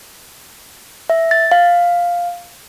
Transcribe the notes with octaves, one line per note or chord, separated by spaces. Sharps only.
E5
A6
F5